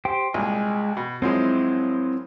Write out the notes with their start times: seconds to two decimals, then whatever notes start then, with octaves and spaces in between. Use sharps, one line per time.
0.05 G4 C5 G5
0.34 C2 A#2 G#3 G#5
0.97 B2
1.22 F#2 F3 G#3 C4 E4